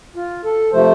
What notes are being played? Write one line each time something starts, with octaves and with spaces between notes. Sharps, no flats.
F4
A4
C3 F3 A3 C5